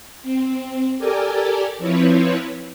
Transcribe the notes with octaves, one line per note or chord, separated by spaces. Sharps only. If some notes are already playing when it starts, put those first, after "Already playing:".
C4
G4 A4 A#4 D5 G#5
F3 C4 E4 B4 C#5